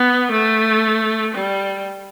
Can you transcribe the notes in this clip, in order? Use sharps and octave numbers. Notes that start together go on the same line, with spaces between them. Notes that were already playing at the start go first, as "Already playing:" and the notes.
Already playing: B3
A3
G3